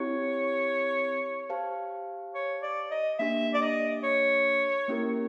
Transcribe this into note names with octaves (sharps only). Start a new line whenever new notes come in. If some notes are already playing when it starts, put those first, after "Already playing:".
Already playing: C4 E4 G4 C#5
G4 C5 F5 A5
C#5
D5
D#5
A#3 D4 G4 E5
D5
D#5
C#5
A#3 C#4 E4 G4 A#4